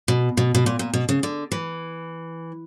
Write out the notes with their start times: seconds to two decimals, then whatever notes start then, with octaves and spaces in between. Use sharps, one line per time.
0.08 B2
0.37 B2
0.55 B2
0.66 A#2
0.79 A#2
0.94 B2
1.09 C#3
1.23 D3
1.52 E3